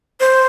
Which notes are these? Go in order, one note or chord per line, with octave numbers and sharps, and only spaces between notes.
C5